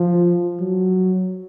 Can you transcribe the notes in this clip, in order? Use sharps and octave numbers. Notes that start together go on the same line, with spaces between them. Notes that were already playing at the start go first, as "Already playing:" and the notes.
Already playing: F3
F#3